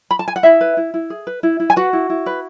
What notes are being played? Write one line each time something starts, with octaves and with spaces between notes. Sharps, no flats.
B5
A5
G#5
F#5
E4 G#4 E5
B4
E4
E4
G#4
B4
E4
E4
G#5
F#4 B4 F#5
E4
E4
B4